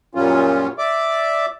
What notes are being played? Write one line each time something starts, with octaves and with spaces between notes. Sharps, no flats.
F#2 A#2 F#3 G3 C#4 F4
D5 E5 D6